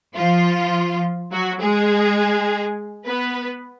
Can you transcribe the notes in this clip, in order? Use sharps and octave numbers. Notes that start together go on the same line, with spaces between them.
F3 F4
F#3 F#4
G#3 G#4
B3 B4